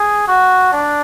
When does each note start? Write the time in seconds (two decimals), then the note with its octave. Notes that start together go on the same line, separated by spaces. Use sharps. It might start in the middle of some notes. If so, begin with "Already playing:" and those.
Already playing: G#4
0.28 F#4
0.73 D4